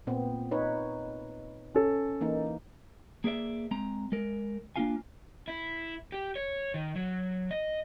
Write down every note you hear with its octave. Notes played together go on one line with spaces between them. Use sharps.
A#2 B3 C4
D#4 B4 C#5
C#4 A4
E3 A#3 D#4
A#3 G#4 B4 D5 E5
G#3 C4 A#5
G#3 A#4
A#3 C#4 D4 F4 F5 G#5
E4
G4
C#5
D#3
F#3
D#5